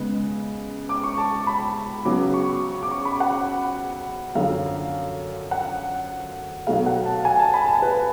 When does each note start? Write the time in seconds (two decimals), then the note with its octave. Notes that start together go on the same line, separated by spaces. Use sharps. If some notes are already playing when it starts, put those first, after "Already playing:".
Already playing: C#3 G#3 B3
0.89 D6
1.04 C#6
1.18 A5
1.47 B5
2.05 C#3 F#3 B3 D6
2.34 C#6
2.83 D6
2.91 C#6
3.05 B5
3.20 F#5
4.35 F#2 D3 F3 F5
5.51 F#5
6.67 B2 F#3 A3 F5
6.86 F#5
7.06 A5
7.25 G#5
7.39 A5
7.54 B5
7.68 A5
7.82 B4